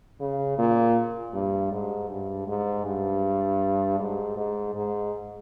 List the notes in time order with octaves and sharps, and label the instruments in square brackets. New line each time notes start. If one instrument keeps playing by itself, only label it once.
[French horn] C#3
A#2
G2
G#2
G2
G#2
G2
G#2
G#2
G#2